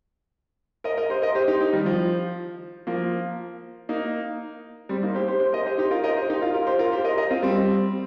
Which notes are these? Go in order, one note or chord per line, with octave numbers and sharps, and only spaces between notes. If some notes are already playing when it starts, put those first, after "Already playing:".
A#4 D#5
A#4 D#5
G4 C5
A#4 D#5
G4 C5
D#4 G4
D#4 G4
D#3 G3
F3
F3 A#3
A#3 D#4
G3 C4
A#3 D#4
G4 C5
G4 C5
G4 C5
A#4 D#5
G4 C5
D#4 G4
F4 A#4
A#4 D#5
G4 C5
D#4 G4
F4 A#4
F4 A#4
G4 C5
F4 A#4
G4 C5
A#4 D#5
A#4 D#5
C4 F4
G3 C4